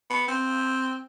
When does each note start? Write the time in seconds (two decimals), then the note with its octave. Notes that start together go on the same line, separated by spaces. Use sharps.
0.10 B3
0.28 C4